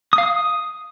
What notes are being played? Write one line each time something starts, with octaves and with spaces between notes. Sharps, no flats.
D#6
F5
D#6